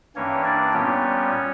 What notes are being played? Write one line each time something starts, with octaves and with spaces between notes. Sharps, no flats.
G2 E3 A#3 C#4 C#5
D4 D5
A#2 G3 B3 C#4 C#5